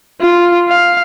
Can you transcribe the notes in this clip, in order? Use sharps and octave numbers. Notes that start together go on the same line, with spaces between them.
F4
F5